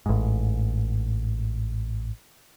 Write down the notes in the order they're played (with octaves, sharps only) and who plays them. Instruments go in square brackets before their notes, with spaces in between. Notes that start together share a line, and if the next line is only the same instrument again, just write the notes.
[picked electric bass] A1 G#2